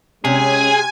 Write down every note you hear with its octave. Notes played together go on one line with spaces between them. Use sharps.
C3 G#3 C#4 G#4 G#5